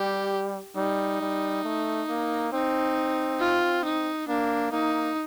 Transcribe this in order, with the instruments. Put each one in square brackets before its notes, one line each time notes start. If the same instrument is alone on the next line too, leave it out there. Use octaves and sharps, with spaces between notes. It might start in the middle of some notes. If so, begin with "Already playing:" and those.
Already playing: [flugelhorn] G3 [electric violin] G4
[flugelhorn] G3 [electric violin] D#4
[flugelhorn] G3
A3
A#3
[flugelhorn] C4 [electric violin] D#4
[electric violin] F4
D#4
[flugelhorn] A#3 [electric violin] D4
[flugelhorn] A#3 [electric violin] D#4